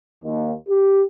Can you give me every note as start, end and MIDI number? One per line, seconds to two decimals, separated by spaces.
0.24 0.52 39
0.69 1.03 67